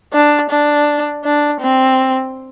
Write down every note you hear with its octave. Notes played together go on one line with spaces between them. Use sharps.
D4
D4
D4
C4